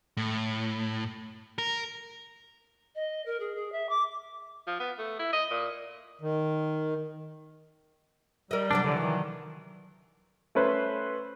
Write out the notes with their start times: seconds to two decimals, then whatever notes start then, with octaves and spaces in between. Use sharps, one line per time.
0.17 A2
1.58 A#4
2.95 D#5
3.26 A#4
3.40 G#4
3.55 G#4
3.72 E5
3.89 D6
4.67 F3
4.80 B3
4.98 A3
5.19 E4
5.33 D#5
5.51 A#2
6.21 D#3
8.51 G3 A#4 D#5
8.71 C3 F#3 D4 D5
8.84 D3 E3
8.97 D#3
10.55 A3 C#4 B4 C5